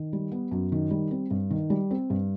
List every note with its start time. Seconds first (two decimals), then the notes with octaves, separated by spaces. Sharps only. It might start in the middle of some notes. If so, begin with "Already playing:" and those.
Already playing: D#3
0.13 G3
0.31 B3
0.51 F#2
0.72 D#3
0.91 G3
1.11 C4
1.31 G2
1.51 D#3
1.70 G3
1.91 C4
2.10 G2